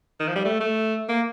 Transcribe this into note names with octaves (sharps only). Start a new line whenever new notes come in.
D#3
F3
G3
A3
A3
A#3